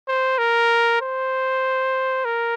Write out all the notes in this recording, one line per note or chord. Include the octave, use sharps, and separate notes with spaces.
C5
A#4
C5
A#4